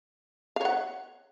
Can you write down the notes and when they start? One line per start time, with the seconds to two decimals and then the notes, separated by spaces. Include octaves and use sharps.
0.56 F5
0.61 C#5
0.65 F#5